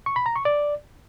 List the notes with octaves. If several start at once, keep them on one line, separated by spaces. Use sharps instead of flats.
C#6
B5
A#5
C#6
D5